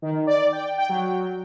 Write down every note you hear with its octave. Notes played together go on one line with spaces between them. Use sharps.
D#3
D5
G5
G5
F#3